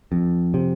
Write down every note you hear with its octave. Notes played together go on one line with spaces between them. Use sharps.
F2
C3